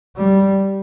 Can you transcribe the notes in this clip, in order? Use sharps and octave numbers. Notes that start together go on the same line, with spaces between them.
G3